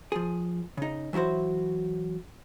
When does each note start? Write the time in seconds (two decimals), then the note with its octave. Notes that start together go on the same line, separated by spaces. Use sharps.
0.12 F3 G#4
0.77 C#3 D#4
1.13 E3 F#3 E4 F#4 C5